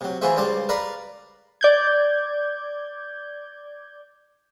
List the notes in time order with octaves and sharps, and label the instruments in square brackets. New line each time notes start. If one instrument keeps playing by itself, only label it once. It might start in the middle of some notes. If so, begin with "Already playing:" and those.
[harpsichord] C3 F#3
E3 F4 F#4 G#4 C5 E5
C#2 G3 F4 C5 A5 D6
A#4 B4 D5 F5 A#5 B5
[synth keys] D5 G6 G#6